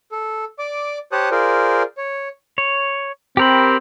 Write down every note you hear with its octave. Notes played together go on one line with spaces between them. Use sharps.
A4
D5 D6
G4 C5 C#5 A5 D#6 F#6
F4 G#4 A#4 C5 D5
C#5
C#5
C4 G4 A#4 B5